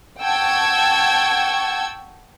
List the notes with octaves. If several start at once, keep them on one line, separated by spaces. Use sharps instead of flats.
F#5 G5 A5 C#6 E6 G#6